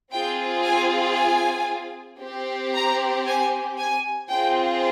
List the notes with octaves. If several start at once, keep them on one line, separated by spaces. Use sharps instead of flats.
C4 F4 G#4 G5
G#5
G#5
C4 G4
A#5
G#5
G#5
C4 F4 G#4 G5